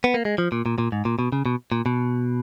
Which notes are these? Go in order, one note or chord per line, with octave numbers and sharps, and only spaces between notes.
B3
A#3
G#3
F3
A#2
A#2
A#2
G#2
A#2
B2
C#3
B2
A#2
B2